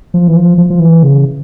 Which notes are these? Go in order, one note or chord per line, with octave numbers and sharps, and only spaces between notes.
F3
E3
F3
F3
F3
E3
C#3